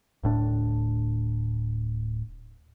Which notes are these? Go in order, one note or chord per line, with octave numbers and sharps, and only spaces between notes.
D1 A2 D4